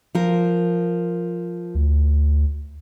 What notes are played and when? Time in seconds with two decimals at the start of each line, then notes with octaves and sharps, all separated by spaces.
0.15 F3 A#4
1.75 D2